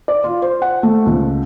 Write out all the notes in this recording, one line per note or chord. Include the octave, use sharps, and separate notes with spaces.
D5
F4
C5
F#5
A3
C#2